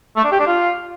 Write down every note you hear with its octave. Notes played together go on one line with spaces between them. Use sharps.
A3
D4
G4
D4
F4